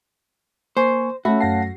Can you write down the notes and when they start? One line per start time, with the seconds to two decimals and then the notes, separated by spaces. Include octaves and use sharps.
0.77 A#3 C5 G#5 C#6
1.25 A3 C#4 F#4 E5 B5
1.40 F#2 F5 F#5 A5 A#6 C7